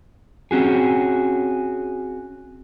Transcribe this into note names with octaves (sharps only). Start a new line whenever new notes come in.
C4 C#4 F#4 G#4